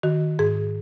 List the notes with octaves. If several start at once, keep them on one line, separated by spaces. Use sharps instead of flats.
D#3 F#4
G#2 G#4